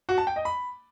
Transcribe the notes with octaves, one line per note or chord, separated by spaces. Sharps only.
F#4
A5
G5
D#5
B5